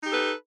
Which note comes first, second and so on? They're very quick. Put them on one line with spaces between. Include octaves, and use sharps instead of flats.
D#4 G4 A4 B4